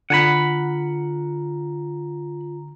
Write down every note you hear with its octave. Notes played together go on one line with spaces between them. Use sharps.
D3 F4 F#5 G#5 A#5 B5